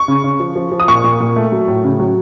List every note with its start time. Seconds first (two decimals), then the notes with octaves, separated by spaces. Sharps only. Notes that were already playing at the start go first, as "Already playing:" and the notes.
Already playing: C#6
0.08 C#3
0.24 C#3
0.40 F3
0.56 F3
0.72 F3
0.80 D#6
0.88 A#2 C#6
1.04 A#2
1.20 A#2
1.36 A3
1.52 F#3
1.68 A2
1.84 C#3
2.00 F#3